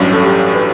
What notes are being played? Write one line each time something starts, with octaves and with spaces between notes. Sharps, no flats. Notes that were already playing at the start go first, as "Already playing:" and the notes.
Already playing: A1 G2 F#3 C#4
A4
G4
B4